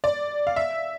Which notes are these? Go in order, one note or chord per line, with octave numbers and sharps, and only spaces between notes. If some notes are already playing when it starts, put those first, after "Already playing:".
D5
F5
E5